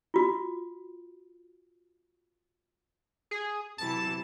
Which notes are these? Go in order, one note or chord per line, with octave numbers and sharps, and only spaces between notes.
F4 F#4
G#4
C3 E3 F#3 A5